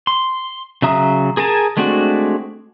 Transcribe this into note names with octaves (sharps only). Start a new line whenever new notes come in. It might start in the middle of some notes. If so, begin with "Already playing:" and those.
C6
C#3 F#3 E5 A#5 D#6
G#4 A#4 G#5 A5
G#3 A3 C4 D4 F#4